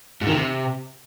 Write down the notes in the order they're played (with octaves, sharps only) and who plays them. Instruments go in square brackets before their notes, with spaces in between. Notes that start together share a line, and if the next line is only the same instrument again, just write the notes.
[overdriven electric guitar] G#2
D#3
C3